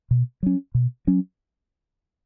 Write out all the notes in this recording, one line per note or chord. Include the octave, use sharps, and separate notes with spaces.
B2
F#3 C#4
B2
F#3 C#4